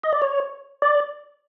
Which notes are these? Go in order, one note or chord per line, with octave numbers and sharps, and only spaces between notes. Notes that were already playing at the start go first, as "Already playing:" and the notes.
D#5
D5
C#5
D5